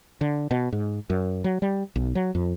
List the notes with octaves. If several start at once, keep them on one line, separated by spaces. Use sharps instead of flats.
D3
B2
G#2
F#2
F#3
G3
B1
F#3
F2